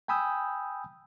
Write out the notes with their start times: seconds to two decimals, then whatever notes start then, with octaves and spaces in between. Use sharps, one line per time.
0.08 G5 G#5 B5 D#6 E6 G6